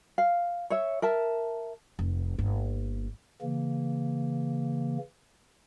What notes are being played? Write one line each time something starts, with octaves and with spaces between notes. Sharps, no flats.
F5
C#5 E5
A#4 E5 A5
F1
G1 A#3
C#3 E3 A#3